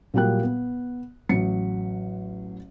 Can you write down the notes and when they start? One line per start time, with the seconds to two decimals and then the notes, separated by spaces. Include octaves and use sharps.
0.14 A#2 F#3 G3 A#3 G5 F#6
0.43 B3
1.29 A1 F#3 C#7